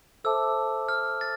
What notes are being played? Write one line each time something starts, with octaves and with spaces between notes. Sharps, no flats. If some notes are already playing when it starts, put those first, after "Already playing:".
A4 C5 E5 A5 D6 E6
F6
A6